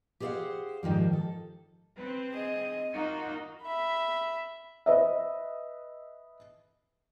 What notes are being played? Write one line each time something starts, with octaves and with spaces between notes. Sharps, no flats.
G4 G#4 C5 D5 F5 F#5
G#2 D#3 F3 G3
A4
C4 B4
G#4 D#5
A#3 D#4 F4 F#4
E5 B5
B4 D#5 E5